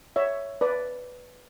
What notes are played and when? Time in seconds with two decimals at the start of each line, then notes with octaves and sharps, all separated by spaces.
0.16 C#5 E5
0.61 B4 D5